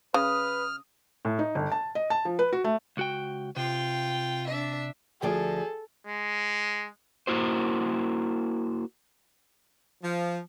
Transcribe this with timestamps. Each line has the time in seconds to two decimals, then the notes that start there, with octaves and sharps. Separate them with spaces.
0.14 C#3 B4 D#6 F6
1.25 A2
1.39 D#4
1.55 G1
1.72 A5
1.95 D#5
2.10 A5
2.25 F3
2.39 B4
2.53 F#4
2.64 A3
2.97 C#2 F#4 G5
3.56 C3 F4 G5
4.48 D4 E5
5.22 D2 F3 G#4 A4 D5
6.07 G#3
7.27 A#3 E4 F#4 C5
10.02 F3